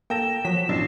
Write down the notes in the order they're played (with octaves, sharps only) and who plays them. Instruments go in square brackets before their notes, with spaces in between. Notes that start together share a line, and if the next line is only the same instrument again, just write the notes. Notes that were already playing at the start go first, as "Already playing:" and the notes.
[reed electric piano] A#3 A4 [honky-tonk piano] G5 A#6 [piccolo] E7
[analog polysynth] F3 F#3 B6 [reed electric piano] F#4
[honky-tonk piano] A1 [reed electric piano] F#2 B2 D4 [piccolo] C7